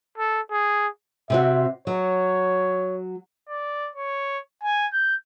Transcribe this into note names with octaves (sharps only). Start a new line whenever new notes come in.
A4
G#4
C3 C4 F#4 E5
F#3 C#5
D5
C#5
G#5
G6